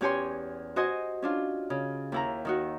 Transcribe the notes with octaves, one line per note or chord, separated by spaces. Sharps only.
E2 C#4 G4 C#5 G#5 C6
F#4 C5 D#5 G#5
C#4 D4 F4
C#3
D#2 E4 A#5
D#3 D#4 F#4